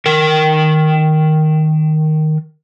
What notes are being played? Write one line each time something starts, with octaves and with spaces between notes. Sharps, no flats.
D#3 A#4